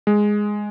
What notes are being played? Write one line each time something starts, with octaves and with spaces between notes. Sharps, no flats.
G#3